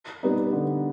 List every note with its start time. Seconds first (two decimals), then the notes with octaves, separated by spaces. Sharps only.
0.23 G3 B3 D#4
0.53 D3